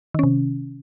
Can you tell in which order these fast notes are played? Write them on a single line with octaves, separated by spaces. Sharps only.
D#3 C#4 C3